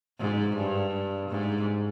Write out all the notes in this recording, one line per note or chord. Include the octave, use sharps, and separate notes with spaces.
G#2
G2
G#2